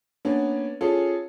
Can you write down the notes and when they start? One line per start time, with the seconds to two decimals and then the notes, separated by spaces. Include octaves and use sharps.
0.25 A#3 B3 C#4 D4
0.81 C#4 F4 G#4 A4